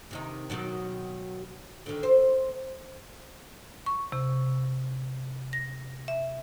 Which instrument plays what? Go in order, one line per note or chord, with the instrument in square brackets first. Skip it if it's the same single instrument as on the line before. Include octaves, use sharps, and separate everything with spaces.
[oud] C3 D#3 D#4
B2 D#3 F#3
D3 D#3
C5
[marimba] C#6
C3
A#6
E5